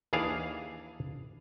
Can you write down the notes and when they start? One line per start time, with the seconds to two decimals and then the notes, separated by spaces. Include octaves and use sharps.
0.13 D#2 E3 D4 G#4 F5